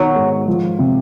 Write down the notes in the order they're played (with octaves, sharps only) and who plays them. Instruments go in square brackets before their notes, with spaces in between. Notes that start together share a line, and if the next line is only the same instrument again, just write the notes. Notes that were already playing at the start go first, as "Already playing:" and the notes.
Already playing: [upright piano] B2 D#3 [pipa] F#3
[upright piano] G#2
F3
C3